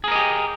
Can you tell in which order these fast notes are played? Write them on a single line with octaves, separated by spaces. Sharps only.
G#4 A#4 D#5 G4